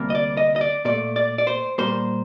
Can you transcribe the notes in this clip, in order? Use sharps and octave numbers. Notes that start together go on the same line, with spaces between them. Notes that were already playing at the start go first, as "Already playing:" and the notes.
Already playing: D2 C3 G3 A#3
D#5
D5
D#5
D#5
D5
A#2 A3 D5
D5
D5
C5
A#2 G3 A#3 C5